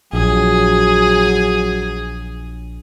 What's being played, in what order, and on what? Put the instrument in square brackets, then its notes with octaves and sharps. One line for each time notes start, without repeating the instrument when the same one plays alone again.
[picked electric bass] A#1 [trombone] F#3 [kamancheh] G#4